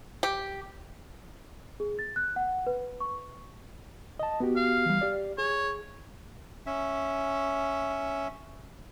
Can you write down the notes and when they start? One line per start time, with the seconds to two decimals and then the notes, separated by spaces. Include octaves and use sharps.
0.23 G4
1.80 G#4
1.99 A6
2.16 F#6
2.36 F#5
2.67 B4
3.00 C#6
4.19 D#5 A5
4.40 B3 F#4 G4
4.56 F5
4.86 E3 G3
5.01 G4 D5
5.38 G#4 C#5
6.66 C#4 E5